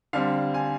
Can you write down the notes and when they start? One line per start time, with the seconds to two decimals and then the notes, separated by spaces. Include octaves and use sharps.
0.13 D3 G3 C4 F5
0.54 G#5